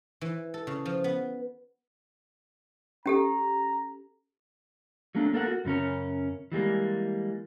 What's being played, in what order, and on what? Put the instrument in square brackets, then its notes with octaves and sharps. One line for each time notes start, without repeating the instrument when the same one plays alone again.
[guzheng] E3
A4
C#3
F3
B3
[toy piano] C#4 G4 A4 [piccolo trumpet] A#5
[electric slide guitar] F#3 A3 A#3 D4
A#3 A4 A#4 F#5
F#4
F#2 C#3 C#4 A#4
E3 G3 G#3 A#3